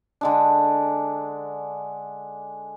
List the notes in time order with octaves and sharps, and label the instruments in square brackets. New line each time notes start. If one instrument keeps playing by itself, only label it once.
[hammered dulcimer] D3 G#3 D4